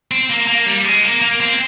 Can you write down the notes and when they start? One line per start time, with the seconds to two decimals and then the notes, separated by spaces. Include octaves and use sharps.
0.11 C4
0.30 A#3
0.48 A#3
0.66 G3
0.84 G#3
1.03 A#3
1.21 A#3
1.40 C4